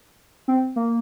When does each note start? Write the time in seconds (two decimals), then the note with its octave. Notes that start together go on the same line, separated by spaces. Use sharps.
0.48 C4
0.76 A#3